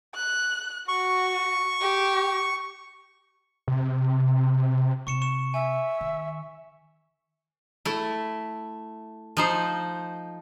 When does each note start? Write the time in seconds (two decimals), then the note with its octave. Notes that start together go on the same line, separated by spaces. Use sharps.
0.15 F#6
0.88 F#4 C#6
1.81 G4
3.68 C3
5.07 C3 C4 C#6 C#7 E7
5.22 C#6 E7
5.54 E5 G#5
6.01 D#3
7.85 A3 E4
9.37 F3 D#4 C5